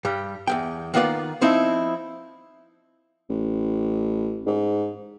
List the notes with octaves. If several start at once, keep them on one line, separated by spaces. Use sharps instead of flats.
G2 G3
E2 D#3 G5
D#3 A#3 B3 F4 D5
F3 C4 D#4 E4
A1
G#2